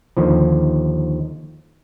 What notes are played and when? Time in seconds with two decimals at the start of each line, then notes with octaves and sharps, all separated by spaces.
0.17 D#2 D3 F3